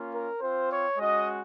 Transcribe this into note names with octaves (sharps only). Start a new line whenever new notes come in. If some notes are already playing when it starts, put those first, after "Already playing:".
Already playing: A#3 C#4 F4
A#4
C4 F4 C5
C#5
G#3 C#4 F#4 D#5